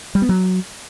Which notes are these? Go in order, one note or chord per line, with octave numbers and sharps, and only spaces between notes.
G3
B3
F#3